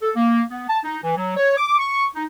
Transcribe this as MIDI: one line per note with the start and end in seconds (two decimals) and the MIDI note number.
0.02 0.11 69
0.16 0.42 58
0.50 0.64 59
0.69 0.78 81
0.84 0.98 63
1.03 1.15 52
1.17 1.35 54
1.37 1.57 73
1.57 1.78 86
1.79 2.06 85
2.15 2.24 63